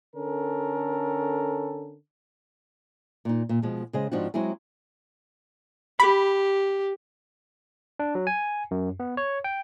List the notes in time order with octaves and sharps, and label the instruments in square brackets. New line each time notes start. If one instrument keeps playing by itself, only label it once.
[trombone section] D3 C#4 A4 A#4
[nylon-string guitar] A#2 D#4
A#2
B2 F3 G#3
C#3 G#3 G#4 C5 D#5
G#2 F3 C4 D4 D#4 F#4
F#3 G#3 C4 E4 G#4
[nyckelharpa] G4 [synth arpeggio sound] B5
[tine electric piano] D4
F#3
G#5
F#2
B3
C#5
G5